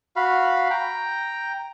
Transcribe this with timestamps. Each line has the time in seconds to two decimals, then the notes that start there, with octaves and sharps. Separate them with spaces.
0.16 F#4 F5 B5
0.70 G5 A#5